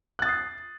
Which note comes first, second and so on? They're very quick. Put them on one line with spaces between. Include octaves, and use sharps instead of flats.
F#6 A6 D#6 C7